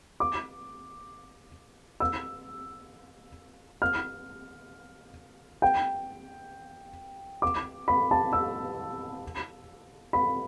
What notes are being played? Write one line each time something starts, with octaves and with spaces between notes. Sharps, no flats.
D6
E6
F6
G5
D6
B5
A5
E6
B5